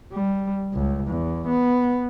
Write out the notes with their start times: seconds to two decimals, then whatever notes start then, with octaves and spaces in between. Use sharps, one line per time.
0.12 G3
0.73 C#2
1.08 E2
1.48 B3